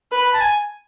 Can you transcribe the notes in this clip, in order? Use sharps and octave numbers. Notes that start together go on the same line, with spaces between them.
B4
B5
A5
G#5